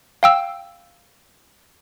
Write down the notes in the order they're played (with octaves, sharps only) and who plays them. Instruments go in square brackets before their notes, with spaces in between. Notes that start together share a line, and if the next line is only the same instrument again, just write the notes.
[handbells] F5 G5 E6